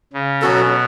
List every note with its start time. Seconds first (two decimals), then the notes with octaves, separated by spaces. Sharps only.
0.13 C#3
0.42 B2 F#3 C#4 F#4 A4